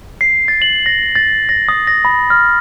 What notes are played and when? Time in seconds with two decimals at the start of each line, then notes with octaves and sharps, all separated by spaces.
0.21 C7
0.48 A6
0.62 F#7
0.86 A#6
1.15 A6
1.49 A#6
1.69 D#6
1.87 A#6
2.05 B5
2.30 F6